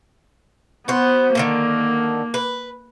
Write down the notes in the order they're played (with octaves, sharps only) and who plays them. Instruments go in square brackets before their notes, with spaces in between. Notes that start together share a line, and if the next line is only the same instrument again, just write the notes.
[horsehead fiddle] B3 [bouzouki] F#4 C5
[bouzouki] B2 D3 D#3 [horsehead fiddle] A#3
[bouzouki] B4